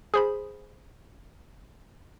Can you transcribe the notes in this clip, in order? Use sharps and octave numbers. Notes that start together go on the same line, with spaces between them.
G#4 C5 B5